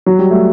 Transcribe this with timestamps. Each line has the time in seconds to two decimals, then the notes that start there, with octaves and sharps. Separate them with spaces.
0.06 F#3
0.19 G3
0.31 A3